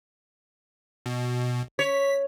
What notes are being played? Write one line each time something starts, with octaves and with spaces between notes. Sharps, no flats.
B2
C#5 B6